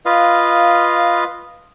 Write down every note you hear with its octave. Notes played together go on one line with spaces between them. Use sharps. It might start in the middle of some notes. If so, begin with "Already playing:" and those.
F4 B4 D#5 F5